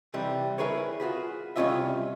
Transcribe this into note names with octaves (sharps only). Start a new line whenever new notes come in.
C3 E3 G3
E4 G#4 A#4 B4 C#5
F4 F#4 G#4 B4
C2 G3 C#4 F4 D#5 E5